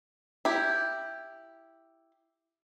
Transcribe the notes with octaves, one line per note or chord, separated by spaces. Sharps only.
E4 G4